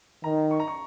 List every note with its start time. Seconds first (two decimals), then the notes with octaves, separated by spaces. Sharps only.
0.24 D#3 A#5
0.51 C#6
0.60 A#5
0.68 C#6